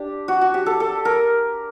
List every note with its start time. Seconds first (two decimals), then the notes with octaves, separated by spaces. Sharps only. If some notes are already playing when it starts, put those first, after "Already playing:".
Already playing: D4 G4
0.28 F#4
0.41 F#4
0.54 G4
0.66 A4
0.80 A4
1.05 A#4